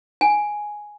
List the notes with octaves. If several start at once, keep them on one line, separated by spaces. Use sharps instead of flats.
G#5